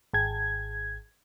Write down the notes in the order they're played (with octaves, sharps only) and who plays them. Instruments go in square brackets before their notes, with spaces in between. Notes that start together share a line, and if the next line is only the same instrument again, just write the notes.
[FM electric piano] G#1 G#6